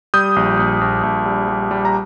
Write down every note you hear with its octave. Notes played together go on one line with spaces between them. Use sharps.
G3 D#6 G6
A#1
A#1
A#1
A#1
G3
G3
G3
A#5